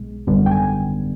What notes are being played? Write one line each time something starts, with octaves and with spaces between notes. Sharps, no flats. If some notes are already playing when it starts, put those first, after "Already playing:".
Already playing: B1 B2 G#3
G#1 F#2 D3 G3 B3
G5
G#5